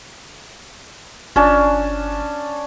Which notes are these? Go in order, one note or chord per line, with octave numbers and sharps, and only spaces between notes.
G1 C#4 D4 A5